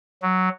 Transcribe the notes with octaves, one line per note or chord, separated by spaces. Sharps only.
F#3